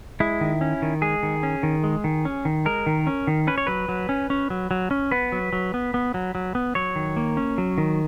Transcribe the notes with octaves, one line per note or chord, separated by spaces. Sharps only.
G#3 E4
D#3
C#4
D#3
G#3 G#4
D#3
C#4
D#3
G#3
D#3
C#4
D#3
G#3 A#4
D#3
C#4
D#3
C#4 B4
C#5
F#3 B4
F#3
C#4
C#4
F#3
F#3
C#4
B3 B4
F#3
F#3
B3
B3
F#3
F#3
B3
F#3 C#5
D#3
A#3
C#4
F#3
D#3